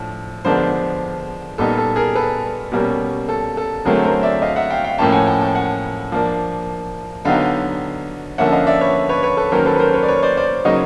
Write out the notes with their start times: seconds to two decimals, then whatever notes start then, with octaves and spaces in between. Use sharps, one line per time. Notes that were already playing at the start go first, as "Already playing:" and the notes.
Already playing: A2 F3 D4
0.45 D3 F3 G#3 B3 D4 A#4 C5
1.58 A#2 G3 B3 D#4 A4
1.78 A4
1.96 G#4 A#4
2.15 A4 B4
2.72 B2 G3 A#3 C#4
3.29 A4
3.57 A4
3.85 D3 F#3 A3 C4 G#4 A#4
4.04 A#4 C5
4.23 D5 E5
4.42 D#5 F5
4.56 E5 F#5
4.70 F5 G5
4.84 F5 G5
4.98 A2 F3 A#3 C#4 G5 A5
5.12 F#5 G#5
5.27 G5 A5
5.41 G5 A5
5.55 F#5 G#5
6.12 F3 A#3 D4
7.25 D3 F#3 B3 D#4 F5 G5
8.38 D3 F3 A#3 C#4 E5 F#5
8.52 D#5 F5
8.67 D5 E5
8.81 B4 C#5
9.09 B4 C#5
9.23 B4 C#5
9.37 A4 B4
9.51 D#3 F#3 A#3 C#4 A#4 C5
9.66 A4 B4
9.76 B4
9.79 A#4 C5
9.94 B4 C#5
10.03 D5
10.08 B4 C#5
10.23 C5 D5
10.37 C5 D5
10.65 C#3 F#3 A#3 D#4 C#5 D#5